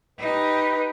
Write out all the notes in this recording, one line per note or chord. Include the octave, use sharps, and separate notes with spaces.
D#4 G4 B4